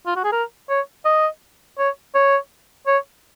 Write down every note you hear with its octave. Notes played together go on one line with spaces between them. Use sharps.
F4
F#4
G#4
A#4
C#5
D#5
C#5
C#5
C#5